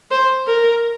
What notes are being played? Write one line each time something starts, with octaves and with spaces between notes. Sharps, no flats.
C5
A#4